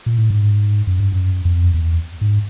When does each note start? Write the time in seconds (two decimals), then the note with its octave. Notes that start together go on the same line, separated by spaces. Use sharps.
0.06 A#2
0.18 A2
0.30 G#2
0.87 F#2
1.00 G2
1.12 F#2
1.45 F2
1.74 E2
2.21 G#2